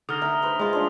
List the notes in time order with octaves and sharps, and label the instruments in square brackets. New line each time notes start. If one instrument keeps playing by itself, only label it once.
[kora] D3 D#4 [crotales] D#6 F6 A#6
[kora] D#4 [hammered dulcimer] A#4 E5
[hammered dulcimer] B4 C5
[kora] G#3 F4 [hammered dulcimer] G#4 D#5
[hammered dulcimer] F3 D4